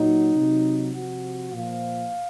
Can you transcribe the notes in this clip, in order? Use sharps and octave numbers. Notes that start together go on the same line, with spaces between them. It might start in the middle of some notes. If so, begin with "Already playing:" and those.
Already playing: A#2 F#3 D#4
C3 F#3
C3 F3 F#4
A#2 F3 F5